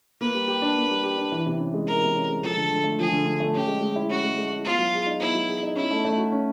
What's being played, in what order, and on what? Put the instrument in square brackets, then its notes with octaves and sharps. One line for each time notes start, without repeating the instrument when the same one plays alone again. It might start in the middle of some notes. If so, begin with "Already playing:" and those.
[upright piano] A#3 [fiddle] B4
[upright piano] G3
G4
D4
A#3
G3
G4
D4
E3
C3
C#4
G#3
[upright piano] E3 [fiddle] A#4
[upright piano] C3
C#4
G#3
[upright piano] F3 [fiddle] A4
[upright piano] D3
D3
A3
[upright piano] F3 [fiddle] G#4
[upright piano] D3
D3
A3
[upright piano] C#4 [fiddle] G4
[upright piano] G#3
G#3
E4
[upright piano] C#4 [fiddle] F#4
[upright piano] G#3
G#3
E4
[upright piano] B3 [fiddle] F4
[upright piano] F#3
G#4
D#4
[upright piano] B3 [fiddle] E4
[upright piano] F#3
G#4
D#4
[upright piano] C#4 [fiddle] E4
[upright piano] A3
A3
F#4
C#4